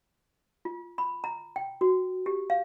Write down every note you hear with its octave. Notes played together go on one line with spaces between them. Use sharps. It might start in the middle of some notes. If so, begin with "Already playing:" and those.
F4
B5
A#5
G5
F#4
G4
F5